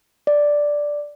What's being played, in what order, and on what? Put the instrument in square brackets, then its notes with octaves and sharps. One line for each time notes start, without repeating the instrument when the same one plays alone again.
[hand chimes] D5